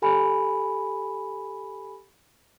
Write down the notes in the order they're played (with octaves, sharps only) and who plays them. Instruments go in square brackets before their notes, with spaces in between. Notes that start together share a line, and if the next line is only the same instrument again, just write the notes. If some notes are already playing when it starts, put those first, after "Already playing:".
[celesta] G4 A4 G#5 B5